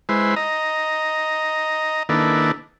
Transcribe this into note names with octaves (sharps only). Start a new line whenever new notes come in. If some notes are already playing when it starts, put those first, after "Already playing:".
G#3 E4 B4 C5
D#5 A#5
D#3 A#3 D4 E4 A4 B4